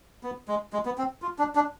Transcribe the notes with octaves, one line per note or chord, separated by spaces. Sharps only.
B3
G#3
G#3
B3
C4
F4
D4
D4